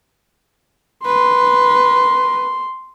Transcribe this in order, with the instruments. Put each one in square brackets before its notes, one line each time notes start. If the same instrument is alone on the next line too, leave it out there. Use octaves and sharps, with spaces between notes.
[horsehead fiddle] B4 [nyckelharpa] C6